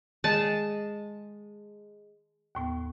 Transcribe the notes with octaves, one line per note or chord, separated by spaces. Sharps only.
D#3 G#3 A5
D#2 A2 B3